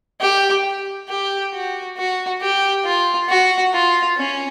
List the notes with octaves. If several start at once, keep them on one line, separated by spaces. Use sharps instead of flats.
G4
G4
F#4
F#4
G4
F4
F#4
F4
C#4